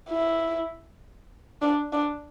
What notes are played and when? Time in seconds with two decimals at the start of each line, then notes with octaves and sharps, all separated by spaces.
0.09 E4
1.62 D4
1.92 D4